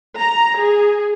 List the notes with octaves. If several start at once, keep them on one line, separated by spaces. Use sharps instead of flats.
A#5
G#4